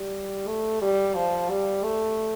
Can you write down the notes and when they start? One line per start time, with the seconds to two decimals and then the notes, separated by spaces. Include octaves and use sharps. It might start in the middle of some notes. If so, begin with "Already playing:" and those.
Already playing: G3
0.47 A3
0.82 G3
1.15 F3
1.50 G3
1.84 A3